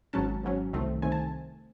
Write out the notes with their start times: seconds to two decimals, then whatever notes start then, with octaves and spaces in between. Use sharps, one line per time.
0.13 G#1 G#2 F#3 C#4 A5
0.43 G#1 G#2 F#3 C#4
0.73 C2 C3 D#3 A3 C4
1.02 C2 C3 D#3 A3 C4 G#5
1.12 A5